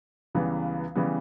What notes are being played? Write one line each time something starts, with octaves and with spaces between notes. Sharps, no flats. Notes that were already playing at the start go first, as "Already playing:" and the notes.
C#2 C#3 E3 G3 B3
C#3 E3 G3 B3